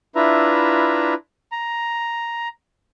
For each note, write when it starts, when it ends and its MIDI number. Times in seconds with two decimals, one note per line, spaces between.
0.15 1.14 62
0.15 1.14 64
0.15 1.14 65
0.15 1.14 71
0.15 1.14 76
0.15 1.14 82
1.52 2.48 82